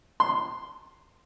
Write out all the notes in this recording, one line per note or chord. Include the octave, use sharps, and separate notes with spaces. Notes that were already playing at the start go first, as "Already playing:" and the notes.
C6